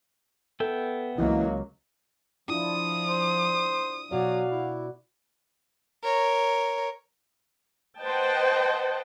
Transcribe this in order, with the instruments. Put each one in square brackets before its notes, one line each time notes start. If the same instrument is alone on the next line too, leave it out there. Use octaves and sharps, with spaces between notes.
[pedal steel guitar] B3 E5 G5 [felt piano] A4
[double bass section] C#2 F#3 A#3 [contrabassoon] E3 [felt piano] D#5 F5
[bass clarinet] F3 [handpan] D4 E4 F4 [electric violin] D#6
[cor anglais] C5
[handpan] B2 F#4 D5 [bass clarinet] F#3 [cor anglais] F5
[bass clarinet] E4
[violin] A#4 C#5
[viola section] B4 C5 D#5 F#5 G5 A5